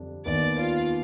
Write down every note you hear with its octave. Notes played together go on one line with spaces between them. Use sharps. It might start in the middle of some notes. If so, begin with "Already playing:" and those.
Already playing: F2 D3 G3 D4
D#2 D#3 B3 D5
F4